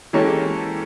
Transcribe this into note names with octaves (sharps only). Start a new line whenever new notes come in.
E3 G#3 A#3 C#4 G4 A4